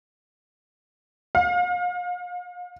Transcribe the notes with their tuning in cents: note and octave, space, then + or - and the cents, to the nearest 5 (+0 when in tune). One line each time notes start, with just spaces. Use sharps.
F5 +40